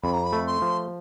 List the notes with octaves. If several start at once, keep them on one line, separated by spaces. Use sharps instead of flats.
F2 B5
A#5
B5
A3
C6
F3